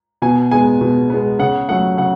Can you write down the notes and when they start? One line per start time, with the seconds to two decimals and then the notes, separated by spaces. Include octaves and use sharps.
0.22 B2 G#5
0.51 G#3 B3 G#5
0.81 B2
1.10 G#3 B3
1.39 C#3 F#5
1.69 F#3 A3 F#5
1.98 C#3 F#5